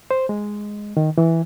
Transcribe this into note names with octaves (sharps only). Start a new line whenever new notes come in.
C5
G#3
D#3
E3